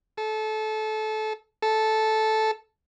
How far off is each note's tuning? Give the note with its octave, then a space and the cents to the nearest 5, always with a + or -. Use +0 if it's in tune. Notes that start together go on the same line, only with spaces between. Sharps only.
A4 -25
A4 -10